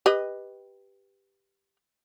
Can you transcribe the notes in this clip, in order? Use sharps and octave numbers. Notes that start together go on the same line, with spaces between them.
G4 B4 D#5